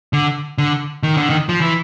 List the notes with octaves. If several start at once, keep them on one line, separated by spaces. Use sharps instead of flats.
D3
D3
D#3
D3
D#3
F3
E3